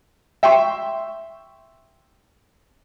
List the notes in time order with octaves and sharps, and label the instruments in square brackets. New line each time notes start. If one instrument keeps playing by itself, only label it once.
[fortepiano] E5 G5 C6 C#6